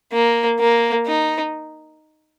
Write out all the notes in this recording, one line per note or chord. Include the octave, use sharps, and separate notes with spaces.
A#3
A#3
D#4